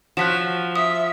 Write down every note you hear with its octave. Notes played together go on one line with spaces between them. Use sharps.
F3 F#4 C#5 F#6 B6 E7
E5 D#6